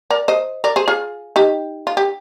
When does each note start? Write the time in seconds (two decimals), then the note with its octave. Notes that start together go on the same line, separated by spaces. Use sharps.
0.10 A#4 D5
0.28 C5 D#5
0.64 A#4 D5
0.76 G#4 C5
0.88 F4 G#4
1.36 D#4 G4
1.87 F4
1.97 G4